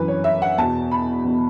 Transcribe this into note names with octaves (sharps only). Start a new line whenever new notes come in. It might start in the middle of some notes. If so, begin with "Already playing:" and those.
Already playing: F#2 E3 B4
C#5
E5
F#5
E2 B2 A5
B5
E2 B2